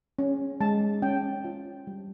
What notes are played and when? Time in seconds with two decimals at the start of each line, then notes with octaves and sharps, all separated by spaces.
0.19 C#4
0.60 G#3 A5
1.02 C#4 G5
1.45 F4
1.87 G3